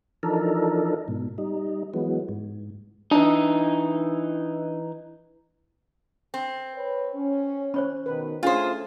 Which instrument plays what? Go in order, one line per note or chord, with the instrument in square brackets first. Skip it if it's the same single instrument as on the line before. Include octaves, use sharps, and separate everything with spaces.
[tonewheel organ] E3 F3 D4 D#4 A4 A#4
G#2 B2
G3 D#4
E3 F#3 G#3 B3
G#2
[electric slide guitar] E3 D#4 [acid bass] D4
[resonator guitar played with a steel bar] C4
[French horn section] B4 C#5
C#4
[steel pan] C#4 [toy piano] C5 C#5 B5
[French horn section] B2 D#3 [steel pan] B4
[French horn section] A3 [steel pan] C#4 G#4 [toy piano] D4 [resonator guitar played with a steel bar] F4 C5